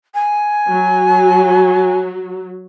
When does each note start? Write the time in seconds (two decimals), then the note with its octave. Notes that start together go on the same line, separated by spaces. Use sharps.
0.14 G#5
0.69 F#3